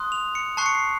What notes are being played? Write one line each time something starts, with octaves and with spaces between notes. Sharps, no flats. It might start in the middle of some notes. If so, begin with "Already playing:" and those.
Already playing: C6 D#6 F#6
F7
C#7
A5 C#6 F#6 C7
C#7
C7